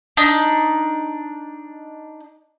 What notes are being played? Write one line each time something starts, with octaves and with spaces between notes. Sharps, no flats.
D4 D#4